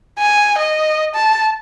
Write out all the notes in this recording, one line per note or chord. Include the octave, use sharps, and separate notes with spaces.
G#5
D#5
A5